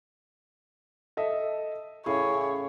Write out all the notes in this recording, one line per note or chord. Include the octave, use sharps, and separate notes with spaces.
A4 D#5 E5
A2 C#3 E3 G#4 C#5